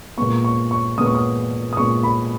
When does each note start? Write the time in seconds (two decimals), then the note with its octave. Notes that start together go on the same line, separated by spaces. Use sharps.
0.18 A#2 G#3 B3 C#6
0.44 C#6
0.71 C#6
0.98 A#2 G#3 B3 D#6
1.06 C#6
1.15 D#6
1.73 D#6
1.77 A#2 G#3 B3 C#6
2.03 B5